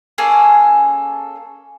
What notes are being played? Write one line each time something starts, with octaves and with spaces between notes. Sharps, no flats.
A#3 C#4 G#4 A4